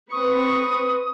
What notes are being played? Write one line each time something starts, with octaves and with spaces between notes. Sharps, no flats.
C4 B4 C#6 D#6